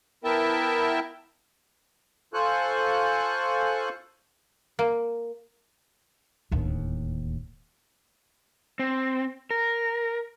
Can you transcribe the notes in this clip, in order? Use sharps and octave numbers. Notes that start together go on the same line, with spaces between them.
B3 E4 A#4 E5 G5 A5
F4 A4 C5 G#5 C#6 F#6
A#3
D1 D#2
C4
A#4